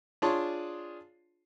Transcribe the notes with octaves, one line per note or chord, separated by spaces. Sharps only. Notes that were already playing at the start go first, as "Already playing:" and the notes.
D4 F4 G#4 C#5 A5 C6